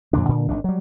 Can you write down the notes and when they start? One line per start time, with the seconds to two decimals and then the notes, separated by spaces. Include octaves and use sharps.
0.13 F2 A#2 D3 D4
0.29 A#2 D3
0.49 G#1 D#3 D4
0.64 F#3 G3